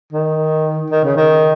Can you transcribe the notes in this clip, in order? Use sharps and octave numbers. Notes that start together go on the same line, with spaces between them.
D#3
D#3
C#3
D#3